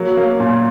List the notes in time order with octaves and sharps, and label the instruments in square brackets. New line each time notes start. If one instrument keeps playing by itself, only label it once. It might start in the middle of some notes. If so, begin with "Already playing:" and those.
Already playing: [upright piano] F#3 A#3
A#3
A#2